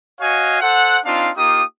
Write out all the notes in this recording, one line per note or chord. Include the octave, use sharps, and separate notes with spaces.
F#4 C#5 D#5 F5 G#5
A4 C5 F#5
C4 D4 D#4 F4 F5
A#3 D#4 F4 G4 D#6